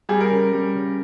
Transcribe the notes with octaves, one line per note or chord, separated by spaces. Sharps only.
G3 G#4
A#4
C#3
G3
C#3